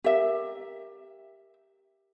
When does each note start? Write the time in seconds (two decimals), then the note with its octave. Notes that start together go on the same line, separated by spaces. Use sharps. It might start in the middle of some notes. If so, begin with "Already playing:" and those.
0.04 G4 A#4 E5